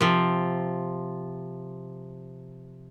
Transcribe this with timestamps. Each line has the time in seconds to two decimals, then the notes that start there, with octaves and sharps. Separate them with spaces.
0.01 C3 F3